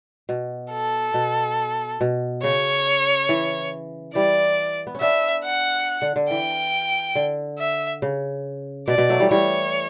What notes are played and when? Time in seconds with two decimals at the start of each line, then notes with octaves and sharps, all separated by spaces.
0.29 B2
0.72 A4
1.14 B2
2.01 B2
2.43 C#3 C#5
3.29 E3
4.15 E3 G3 D5
4.87 B3
4.95 C#4
5.01 B3 D4 E5
5.44 F#5
6.02 D3
6.16 D3
6.30 E3 G5
7.15 D3
7.59 E5
8.02 C#3
8.88 B2 D5
8.98 B2
9.09 F#3 A3
9.20 E3 G3
9.31 E3 G3 C#5